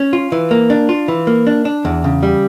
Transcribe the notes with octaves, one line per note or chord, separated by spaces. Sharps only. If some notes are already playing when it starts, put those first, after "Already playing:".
Already playing: C#4
F4
E3
A#3
D4
F4
E3
A#3
D4
D4
E2
C#3
G3